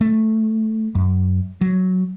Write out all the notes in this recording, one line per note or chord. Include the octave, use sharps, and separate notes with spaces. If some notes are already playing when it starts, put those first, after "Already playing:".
A3
F#2
F#3